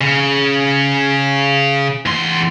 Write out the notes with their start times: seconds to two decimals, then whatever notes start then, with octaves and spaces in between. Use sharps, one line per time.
0.01 C#3
2.06 E2 C6